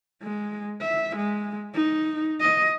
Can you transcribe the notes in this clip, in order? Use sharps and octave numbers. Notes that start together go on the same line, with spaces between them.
G#3
E5
G#3
D#4
D#5